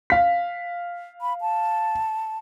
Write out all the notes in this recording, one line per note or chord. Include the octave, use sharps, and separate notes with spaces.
F5 B6
B5
A5